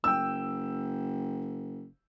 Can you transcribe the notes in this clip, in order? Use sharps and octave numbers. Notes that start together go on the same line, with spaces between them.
F#1 G5 E6